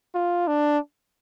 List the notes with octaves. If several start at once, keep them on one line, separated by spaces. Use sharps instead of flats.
F4
D4